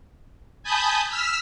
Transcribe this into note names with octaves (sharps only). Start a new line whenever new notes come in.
G#5 A5 B5 D#6 G6
E6 F6 B6